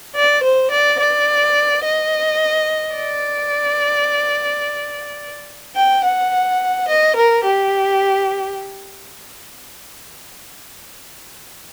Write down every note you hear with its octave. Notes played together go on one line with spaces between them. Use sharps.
D5
C5
D5
D5
D#5
D5
G5
F#5
D#5
A#4
G4